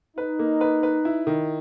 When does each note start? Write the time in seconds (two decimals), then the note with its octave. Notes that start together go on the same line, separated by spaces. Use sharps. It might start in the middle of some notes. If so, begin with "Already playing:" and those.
0.17 D#4 B4
0.39 A#3
0.61 B4
0.83 B4
1.05 E4
1.27 D#3